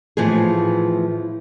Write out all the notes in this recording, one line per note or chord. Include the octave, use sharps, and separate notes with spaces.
A2 E3 F3 B3 G#4